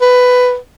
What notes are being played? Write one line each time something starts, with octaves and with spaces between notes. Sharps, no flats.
B4